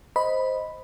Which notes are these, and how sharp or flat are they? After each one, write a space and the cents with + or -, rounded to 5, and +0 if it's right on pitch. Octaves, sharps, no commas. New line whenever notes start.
C5 +0 D#5 +5 B5 +0